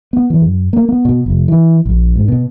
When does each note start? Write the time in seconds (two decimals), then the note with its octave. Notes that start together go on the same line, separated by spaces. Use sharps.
0.13 B3
0.30 E3
0.41 F#2
0.73 A#3
0.89 B3
1.05 B2
1.26 F1
1.48 E3
1.86 A#1
2.16 G#2
2.28 B2